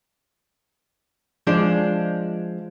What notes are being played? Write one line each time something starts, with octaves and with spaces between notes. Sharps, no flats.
F3 G#3 D4